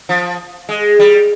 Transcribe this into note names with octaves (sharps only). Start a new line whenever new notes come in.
F3
G#3
G3